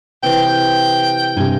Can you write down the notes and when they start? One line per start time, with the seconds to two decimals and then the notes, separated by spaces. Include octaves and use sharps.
0.23 C3 E3 D5 G5
1.37 G2 C3 F5 G#5 A#5